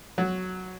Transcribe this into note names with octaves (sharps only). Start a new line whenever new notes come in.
F#3